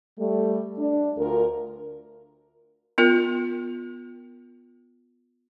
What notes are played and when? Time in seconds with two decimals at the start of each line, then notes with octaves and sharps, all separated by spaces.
0.19 G3 A3
0.78 D4
1.18 D2 F4 A#4
2.98 B3 F4 A#4